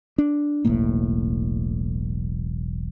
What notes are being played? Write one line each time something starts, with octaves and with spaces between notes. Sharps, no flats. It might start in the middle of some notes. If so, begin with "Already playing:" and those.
D4
E1 B1 A2 A#3